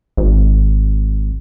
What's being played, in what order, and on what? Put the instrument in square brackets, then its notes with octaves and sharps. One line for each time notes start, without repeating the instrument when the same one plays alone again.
[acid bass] G#1